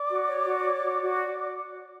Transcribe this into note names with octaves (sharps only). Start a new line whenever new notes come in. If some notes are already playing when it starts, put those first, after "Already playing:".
Already playing: D5 D6
F#4
C#5
F#4
C#5
F#4
F#4